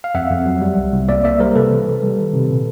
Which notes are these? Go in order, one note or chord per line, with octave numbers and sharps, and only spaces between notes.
F5
F2 E5 F#5
F2
F#3
G3
C2
C2
A#3 D5 E5
A#3 D5 E5
G3 A#4 C5
A#4
C3 A4 B4
E3
C3
G3
D#3
C3
A#2